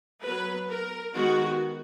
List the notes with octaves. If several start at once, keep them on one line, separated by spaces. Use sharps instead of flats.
F#3 B3 B4
A#4
D#3 G#3 B3 F#4